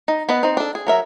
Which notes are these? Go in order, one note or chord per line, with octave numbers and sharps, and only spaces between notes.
D#4
B3 B4 D#5
C4 D#4
D4 A4
G#4
F#3 A#4 E5